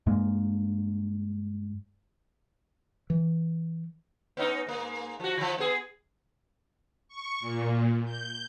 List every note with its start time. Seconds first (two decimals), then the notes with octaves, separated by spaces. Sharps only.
0.07 G2 G#3 A#3
3.10 E3
4.37 B3 C#4 D#4
4.67 G#2 A#3
5.20 F3 F#4
5.38 D#3 F3
5.58 B3 G#4
7.08 C#6
7.40 A#2
8.05 G6